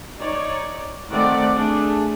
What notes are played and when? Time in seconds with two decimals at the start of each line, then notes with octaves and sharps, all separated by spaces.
0.19 D#4 C#5 D5
1.11 D#3 A3 C4 D5 F#5
1.55 A3 D4 G#4